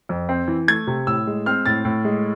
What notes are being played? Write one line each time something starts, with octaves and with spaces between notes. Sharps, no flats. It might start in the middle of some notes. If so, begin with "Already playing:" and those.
F2
C4
E3
A3 G#6
C3
A2 E6
G#3
C4 F6
A2 A6
A2
G#3